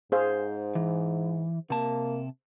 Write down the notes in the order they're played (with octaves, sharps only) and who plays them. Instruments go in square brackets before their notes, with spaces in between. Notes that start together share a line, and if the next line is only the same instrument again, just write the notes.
[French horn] G#2 [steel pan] G#4 C5 F5
[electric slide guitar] E3
[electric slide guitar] C3 A5 [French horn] A#3